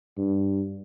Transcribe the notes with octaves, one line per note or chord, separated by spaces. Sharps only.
G2